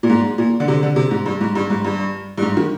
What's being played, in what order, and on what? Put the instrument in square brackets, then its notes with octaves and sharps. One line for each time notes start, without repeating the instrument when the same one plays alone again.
[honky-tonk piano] A#2
G#2
A#2
D3
C3
D3
C3
G#2
G2
G#2
G2
G#2
G2
G2
G#2
D#3